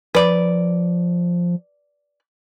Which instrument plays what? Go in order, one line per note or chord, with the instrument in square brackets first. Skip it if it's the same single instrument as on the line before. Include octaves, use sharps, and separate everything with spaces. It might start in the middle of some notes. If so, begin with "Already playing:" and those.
[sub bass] F3 [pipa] B4 D5